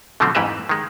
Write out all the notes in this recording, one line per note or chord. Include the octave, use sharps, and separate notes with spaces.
B2 D3 F3 F#3 A3 C4
F2 G#2 E3 G4 B4 E5
D#3 G#3